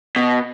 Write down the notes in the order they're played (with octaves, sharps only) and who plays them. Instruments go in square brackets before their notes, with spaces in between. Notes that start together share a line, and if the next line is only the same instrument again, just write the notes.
[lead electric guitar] B2